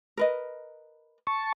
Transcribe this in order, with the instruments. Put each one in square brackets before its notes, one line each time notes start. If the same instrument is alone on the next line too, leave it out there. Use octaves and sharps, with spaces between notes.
[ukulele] A#4 B4 D#5
[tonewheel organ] A5 C#6